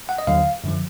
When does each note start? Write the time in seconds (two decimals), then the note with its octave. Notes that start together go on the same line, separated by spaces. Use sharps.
0.09 F#5
0.18 D#5
0.27 D#2 D3 F#3 F5
0.64 F#2 D3 F3